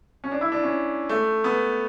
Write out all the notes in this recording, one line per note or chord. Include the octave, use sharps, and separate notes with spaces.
C#4
D4
E4
D4
C#4
A3
B3